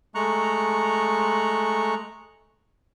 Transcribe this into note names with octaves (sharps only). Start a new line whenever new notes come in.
G#3 A3 A#5 C#6 F#6